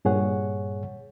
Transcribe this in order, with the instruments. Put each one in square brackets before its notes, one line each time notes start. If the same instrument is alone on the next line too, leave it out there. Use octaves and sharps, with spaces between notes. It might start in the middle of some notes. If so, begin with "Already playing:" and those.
[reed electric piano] G2 A#2 G#4 C#5 F#5